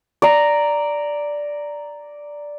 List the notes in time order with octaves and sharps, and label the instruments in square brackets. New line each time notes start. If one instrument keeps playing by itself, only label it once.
[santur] D5 A#5